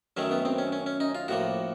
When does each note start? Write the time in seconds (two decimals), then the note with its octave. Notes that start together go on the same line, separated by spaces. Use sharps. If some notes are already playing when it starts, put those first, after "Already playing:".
0.17 F#2 D#3 F#3 A3 C#4
0.31 B3
0.45 C4
0.58 C#4
0.72 C#4
0.86 C#4
1.00 D#4
1.15 F4
1.28 A2 F3 A#3 F#4